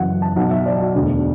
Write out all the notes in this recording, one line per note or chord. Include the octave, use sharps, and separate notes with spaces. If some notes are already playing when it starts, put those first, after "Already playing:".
Already playing: F#1 F#2 E3 F#5
A5
B1 B2 F#5
E5
D5
F#4
E1 D2 D3 F#4